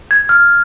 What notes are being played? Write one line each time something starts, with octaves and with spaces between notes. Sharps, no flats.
G#6
F6